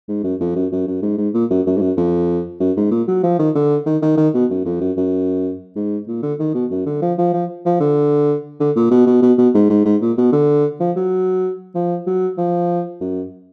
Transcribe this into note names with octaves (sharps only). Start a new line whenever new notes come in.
G#2
F#2
F2
F#2
F#2
F#2
G#2
G#2
A#2
F#2
F#2
G#2
F#2
F2
F#2
G#2
A#2
F#3
F3
D#3
D3
D#3
D#3
D#3
B2
F#2
F2
F#2
F#2
G#2
A#2
D3
D#3
B2
F#2
D3
F3
F3
F3
F3
D3
D3
A#2
B2
B2
B2
B2
G#2
G#2
G#2
A#2
B2
D3
F3
F#3
F3
F#3
F3
F#2